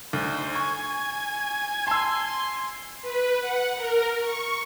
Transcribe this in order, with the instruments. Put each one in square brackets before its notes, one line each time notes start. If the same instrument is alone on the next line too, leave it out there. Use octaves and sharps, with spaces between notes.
[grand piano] D2 [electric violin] D#4 C5
[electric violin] G#5 G#6 [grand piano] C#6
[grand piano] A5 E6 [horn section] C6
[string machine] B4
F#5
A#4
C#6